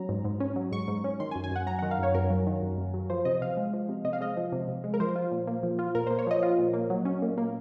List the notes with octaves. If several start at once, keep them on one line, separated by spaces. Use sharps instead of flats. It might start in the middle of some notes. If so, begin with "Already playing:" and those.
Already playing: F#3 C#4 A#5
G#2
G#2
C#4
F#3
G#2 C#6
G#2
C#4
D#3 C6
G#5
F#2
G#5
F#2 F#5
F#3 A#5
F#5
D#3
F5
F#2 C#5
F#2 A#4
F#3
D#3
F#2
F#2
F#3
F3 C5
C3 D#5
C3 F5
G#3
F3
C3
C3 D#5
F5
G#3 D#5
F3
C3
C3
G#3
A#4
F3 C5
F4
A#2
A#3
F3
F4
A#2 A#4
C5
A#3
C#5
F3 D#5
F4
A#2
A#3
F#3
C#4
A#2
A#3